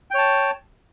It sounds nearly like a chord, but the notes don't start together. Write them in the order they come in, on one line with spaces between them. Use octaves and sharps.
G5 C#5 A5